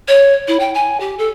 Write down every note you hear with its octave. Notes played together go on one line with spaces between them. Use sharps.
C#5
E4
G5
G#5
G4
A4